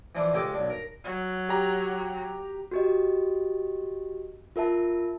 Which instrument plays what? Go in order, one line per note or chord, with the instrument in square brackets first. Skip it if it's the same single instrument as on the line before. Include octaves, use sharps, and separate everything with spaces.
[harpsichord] E3 F3 D4 E4
C#2 G#3 G4 A4 D6
B1 D4
A#4
[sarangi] F#3
[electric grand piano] G4 A#5
[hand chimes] F#4 G4 D#5
F4 A#4 E5 A5